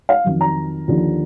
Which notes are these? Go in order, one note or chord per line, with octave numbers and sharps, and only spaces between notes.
F5
F2 D#3 F#3
A#5
D#2 D3 F3